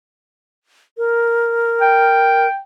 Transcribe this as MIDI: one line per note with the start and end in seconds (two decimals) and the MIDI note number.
0.98 2.47 70
1.81 2.61 79